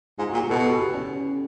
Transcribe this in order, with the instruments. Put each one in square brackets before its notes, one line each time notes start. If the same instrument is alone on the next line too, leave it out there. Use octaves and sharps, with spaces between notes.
[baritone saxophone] G#2 [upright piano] F4
[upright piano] F#4
[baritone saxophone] A#2
[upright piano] G4
[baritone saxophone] B2 [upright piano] A4
[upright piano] G4
G4
C#4